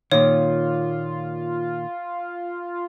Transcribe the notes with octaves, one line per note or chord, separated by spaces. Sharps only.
A#2 D#3 F4 C#5